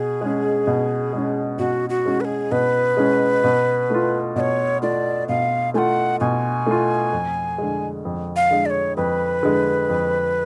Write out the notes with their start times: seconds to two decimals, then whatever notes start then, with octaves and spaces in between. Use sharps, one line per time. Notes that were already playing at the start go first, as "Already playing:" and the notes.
Already playing: B2 G#4
0.21 G#3 C#4
0.67 B2
1.13 G#3 C#4
1.59 B2 F#4
1.90 F#4
2.06 G#3 C#4
2.21 B4
2.25 G#4
2.51 B2 B4
2.97 G#3 C#4
3.44 B2
3.90 A3 F4
4.36 B2 D5
4.40 C#5
4.82 A3 F4 D5
5.29 B2 F5
5.74 A3 F4 F#5 G#5
6.20 B2 G#5
6.66 A3 F4
7.13 F2
7.58 D3 G#3
8.05 F2
8.36 F5
8.51 D3 G#3
8.66 D5
8.70 C#5
8.97 F2 B4
9.43 D3 G#3
9.89 F2